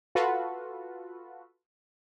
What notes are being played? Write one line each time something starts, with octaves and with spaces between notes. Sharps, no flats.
F4 F#4 A4 B4